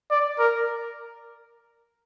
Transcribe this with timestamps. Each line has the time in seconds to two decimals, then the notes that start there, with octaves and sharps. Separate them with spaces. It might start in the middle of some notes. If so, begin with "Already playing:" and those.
0.11 D5
0.39 A#4